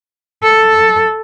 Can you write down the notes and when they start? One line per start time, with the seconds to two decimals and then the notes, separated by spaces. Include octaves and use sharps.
0.43 A4